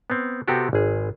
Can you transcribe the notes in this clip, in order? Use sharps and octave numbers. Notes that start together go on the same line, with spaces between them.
B3 C4
C3 B3 C4 F#4 G4 A4
G#1 G#4